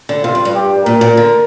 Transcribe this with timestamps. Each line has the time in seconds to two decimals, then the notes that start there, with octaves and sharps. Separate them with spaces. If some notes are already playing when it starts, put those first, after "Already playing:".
0.09 D3
0.24 C3 F4
0.35 G2
0.45 G2
0.55 G4
0.86 A#2 A#4
1.01 A#2
1.17 D3